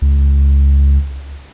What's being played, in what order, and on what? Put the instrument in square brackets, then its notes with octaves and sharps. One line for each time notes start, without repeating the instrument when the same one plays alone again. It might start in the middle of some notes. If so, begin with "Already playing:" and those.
[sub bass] C#2